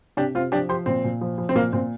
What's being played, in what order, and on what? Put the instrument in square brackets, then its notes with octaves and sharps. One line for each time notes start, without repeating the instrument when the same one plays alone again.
[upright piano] C3 D4 G4
C3 C4 F4
F3 D4 G4
F3 G4 C5
A#2 C4
A#2
F3
F3
C4
A#2 A#3
A#2 C4